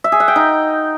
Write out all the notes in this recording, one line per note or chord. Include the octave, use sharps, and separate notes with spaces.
E5
G#4
F#5
G5
D#4